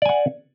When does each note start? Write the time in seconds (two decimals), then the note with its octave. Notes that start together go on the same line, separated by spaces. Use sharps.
0.02 D5
0.06 G#5
0.09 F#5